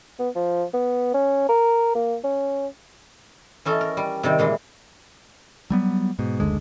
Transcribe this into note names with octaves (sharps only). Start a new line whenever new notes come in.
B3
F3
B3
C#4
A#4
A#3
C#4
E3 C#4 A4 D#5
A#4
G3
C3 D#3 G3
A#2 E3 G#3
F#3 G3 B3
G#2 B2
F#1 D2 D3 G#3